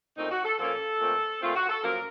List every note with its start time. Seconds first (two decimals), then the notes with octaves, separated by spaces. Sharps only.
0.16 A#2 A3 C4 D#4
0.31 F#4
0.44 A4
0.58 A#2 F3 A#3 C#4 A4
1.00 A#2 A3 C4
1.41 A#2 A3 C4 F4
1.55 F#4
1.69 A4
1.83 F#2 F3 A#3 A#4